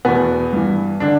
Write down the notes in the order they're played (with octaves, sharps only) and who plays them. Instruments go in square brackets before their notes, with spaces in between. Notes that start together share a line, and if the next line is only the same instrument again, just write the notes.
[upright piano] E2 B2 B3
G2 E3
D3 D4